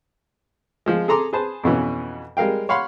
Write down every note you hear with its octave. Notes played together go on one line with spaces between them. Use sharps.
F3 G#3
G#4 A4 A#5 C6 D6
G#4 B4 C5 A5
F2 B2 E3 C#4
G3 G#3 A#4 F5 G5
C#5 F5 F#5 B5 C6